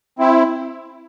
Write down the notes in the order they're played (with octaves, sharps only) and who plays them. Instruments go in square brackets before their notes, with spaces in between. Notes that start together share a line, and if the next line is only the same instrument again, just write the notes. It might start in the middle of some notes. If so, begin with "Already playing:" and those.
[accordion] C4 E4